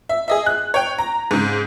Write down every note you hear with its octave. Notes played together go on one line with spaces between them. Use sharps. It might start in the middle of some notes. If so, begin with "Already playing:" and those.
E5
G#4 D#5 E5
F#6
C#5 G5
A#5
G#2 C#3